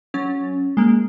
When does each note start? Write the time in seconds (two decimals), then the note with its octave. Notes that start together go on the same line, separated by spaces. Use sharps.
0.14 F#3 C#4 A6
0.77 G#3 A#3